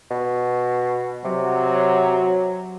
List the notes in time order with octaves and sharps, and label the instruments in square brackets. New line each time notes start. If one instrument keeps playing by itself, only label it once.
[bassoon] B2
[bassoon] C3 [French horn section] F#3